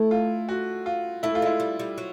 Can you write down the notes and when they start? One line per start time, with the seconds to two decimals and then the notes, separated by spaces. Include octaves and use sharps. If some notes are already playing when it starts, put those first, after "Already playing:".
Already playing: A3 E4
0.11 F4
0.49 F#4
0.86 F4
1.23 A3 E4
1.35 F4
1.42 G#3 E4
1.60 G3
1.80 G3
1.98 F#3